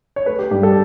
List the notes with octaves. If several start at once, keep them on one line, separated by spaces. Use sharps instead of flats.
C#5
A3 B4
G4
G2 G4
A4